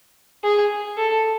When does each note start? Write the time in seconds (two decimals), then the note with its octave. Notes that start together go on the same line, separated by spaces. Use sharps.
0.43 G#4
0.97 A4